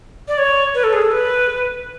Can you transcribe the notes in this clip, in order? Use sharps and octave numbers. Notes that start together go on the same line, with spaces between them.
D5
C#5
B4
A4
G#4
A4
B4